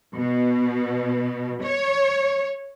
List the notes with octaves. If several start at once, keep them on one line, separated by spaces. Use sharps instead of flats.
B2
C#5